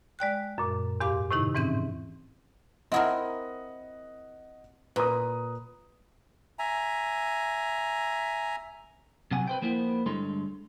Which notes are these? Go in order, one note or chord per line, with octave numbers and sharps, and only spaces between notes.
G#3 D5 G5 F#6
F#2 A#2
E2 G#2 G4 F5 C6 D6
A2 C3 D#3 D#4 E4
G#2 E3 C4 C#4 G6
C4 E4 A#4 D#5 F#5 D#6
A#2 B4 A#5 D#6
E5 G#5 A#5
C3 F#3 F#5 G#5
B4 C5 G5
F3 A#3 B3 E4 C5
G2 D3 G#3 A4 C#5 C6